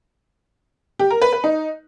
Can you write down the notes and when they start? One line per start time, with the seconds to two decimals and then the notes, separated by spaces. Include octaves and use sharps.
0.99 G4
1.10 A#4
1.22 B4
1.33 B4
1.44 D#4